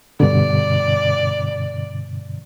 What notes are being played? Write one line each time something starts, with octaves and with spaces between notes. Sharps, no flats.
G2 B2 D3 D5